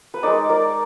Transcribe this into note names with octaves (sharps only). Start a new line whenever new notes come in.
B4
G#3 D#4 A#4 D5
A#4 D5